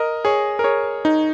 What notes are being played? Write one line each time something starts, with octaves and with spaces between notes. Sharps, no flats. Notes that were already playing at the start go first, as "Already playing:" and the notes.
Already playing: A#4 D#5
G#4 C#5
A#4
G#4 C#5
D#4